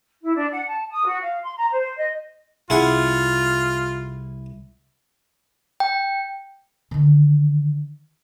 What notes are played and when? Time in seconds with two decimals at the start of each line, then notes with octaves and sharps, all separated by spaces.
0.23 E4
0.35 D4
0.53 F#5
0.68 A5
0.89 D#6
1.06 F#4
1.22 F5
1.43 C6
1.57 A#5
1.72 C5
1.97 D#5
2.70 C2 C3 E4 F4 G#4 F#5
5.80 G5
6.91 D3 D#3